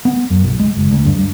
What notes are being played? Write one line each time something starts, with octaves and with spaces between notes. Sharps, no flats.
B3
F#2
B1
G#3
F#1
D2
G2
G2